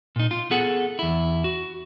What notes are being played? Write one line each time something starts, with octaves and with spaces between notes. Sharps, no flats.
A#2 D#4
F4
B3 G#4 A4 F#5
E2 E4
F#4